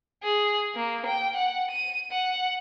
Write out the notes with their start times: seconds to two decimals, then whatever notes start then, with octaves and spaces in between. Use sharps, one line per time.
0.23 G#4
0.75 A#3
1.06 G5
1.36 F#5
1.71 D#7
2.12 F#5